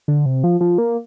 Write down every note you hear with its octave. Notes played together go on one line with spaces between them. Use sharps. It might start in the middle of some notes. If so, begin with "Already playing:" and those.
D3
C3
F3
F3
A#3